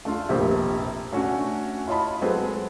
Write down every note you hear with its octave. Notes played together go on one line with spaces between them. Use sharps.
A3 D4 F4
F1 A#1 A#3 C4 G4 E5
A3 C#4 D4 F#4
E4 F4 C#5 D#5 A5 B5
F#3 G#3 C4 A4 B4